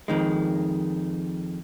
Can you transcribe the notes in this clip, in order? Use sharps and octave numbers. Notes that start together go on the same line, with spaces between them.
F2 D#3 G#3